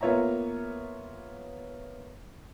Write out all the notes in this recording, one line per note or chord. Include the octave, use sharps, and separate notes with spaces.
A#3 B3 F4 C#5 E5 A#5